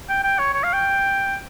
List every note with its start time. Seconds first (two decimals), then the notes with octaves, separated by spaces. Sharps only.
0.09 G5
0.24 G5
0.39 C#5
0.54 C#5
0.64 F5
0.74 G5